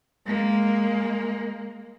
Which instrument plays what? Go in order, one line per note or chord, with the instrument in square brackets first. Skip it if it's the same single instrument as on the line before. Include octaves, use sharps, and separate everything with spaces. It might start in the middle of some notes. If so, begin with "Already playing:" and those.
[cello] G#3 A#3